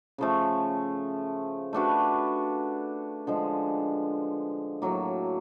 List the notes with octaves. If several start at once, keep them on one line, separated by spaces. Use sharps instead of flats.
C#3 F3 A3
A3 D4 F#4 B4
D3 F3 G#3
A2 F#3 A#3